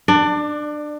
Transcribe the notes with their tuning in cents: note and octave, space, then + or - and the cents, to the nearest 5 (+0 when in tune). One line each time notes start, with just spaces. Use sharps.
D4 +25 D5 +0